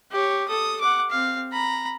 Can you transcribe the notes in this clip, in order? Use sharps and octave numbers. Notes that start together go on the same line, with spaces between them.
G4 C#5
A4 D#6
F#5 D6
C4 F5
A#5 B5